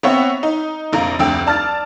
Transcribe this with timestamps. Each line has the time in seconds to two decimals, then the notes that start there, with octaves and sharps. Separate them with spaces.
0.03 B3 C4 C#5 E5 F#5
0.43 D#4
0.93 F1 A#1 A#3 A#5
1.19 F1 D2 G5 E6
1.46 D5 A5 F6 A6